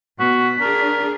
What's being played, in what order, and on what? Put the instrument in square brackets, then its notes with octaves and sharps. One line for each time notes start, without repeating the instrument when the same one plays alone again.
[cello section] B2 [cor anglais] F#4 [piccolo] B6
[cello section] D4 G#4 [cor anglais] A#4